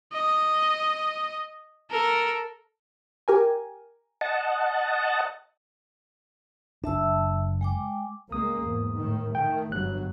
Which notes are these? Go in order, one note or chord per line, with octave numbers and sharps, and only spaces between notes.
D#5
A4 A#4
G4 A#4 G#5
D#5 F#5 A5
F#1 D4 E5 A5 E6
G#3 G5 D6
C#2 G#3 A#3 D#6
E2 G#2
A2 D#3
D#3 A3 G5
G1 G2 F#3 F#6